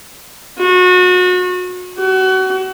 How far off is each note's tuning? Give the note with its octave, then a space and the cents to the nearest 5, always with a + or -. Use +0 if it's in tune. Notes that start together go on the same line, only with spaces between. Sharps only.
F#4 -30
F#4 +30